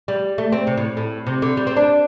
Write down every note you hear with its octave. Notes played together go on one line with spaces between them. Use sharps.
G3
A3
C4
C3
A2
A2
C3
D3
G3
C4
D4